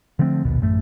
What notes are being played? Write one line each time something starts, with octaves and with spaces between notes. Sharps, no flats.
D3 F3 A3 C4
A#1 D#2 B2
A1 F#2 A3